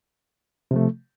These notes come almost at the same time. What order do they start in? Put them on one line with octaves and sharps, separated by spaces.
C3 F3 A3